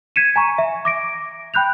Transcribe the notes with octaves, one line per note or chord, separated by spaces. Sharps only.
G#6 B6 C#7 D#7 E7
G#5 A#5 C#6
E5
D6 A#6 D7
G5 B5 F#6 G6 F7